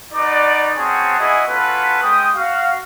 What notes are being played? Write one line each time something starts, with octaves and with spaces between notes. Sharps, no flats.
D#4 F#4 B4 D5
C4 C#4 F#4 G#4 C#5 A5
B3 E4 F#4 G#4 D#5 G#5
C#4 F4 F#4 A4 B4
G#3 C#4 G5 D#6
F#4 F5